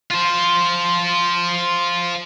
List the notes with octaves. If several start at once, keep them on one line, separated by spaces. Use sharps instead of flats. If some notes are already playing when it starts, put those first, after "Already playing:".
F4 C5